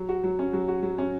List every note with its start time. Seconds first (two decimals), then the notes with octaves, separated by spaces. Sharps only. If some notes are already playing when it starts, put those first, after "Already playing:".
Already playing: F#3
0.09 F#4
0.24 F#3
0.39 C#4
0.53 F#3
0.68 F#4
0.83 F#3
0.98 C#4